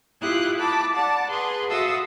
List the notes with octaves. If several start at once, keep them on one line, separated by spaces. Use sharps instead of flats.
E4 F4 G4 D#6 F#6
A5 B5 D6
D5 F#5 A5
G#4 B4 C6
F#4 A4 E5 F5 D#6 E6